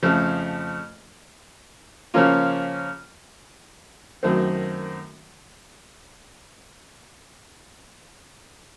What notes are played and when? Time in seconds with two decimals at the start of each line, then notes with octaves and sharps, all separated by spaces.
0.03 F2 C#3 F3 A3
2.14 C#3 F3 A#3 C#4 F4
4.23 F#2 D#3 F#3 A3 C4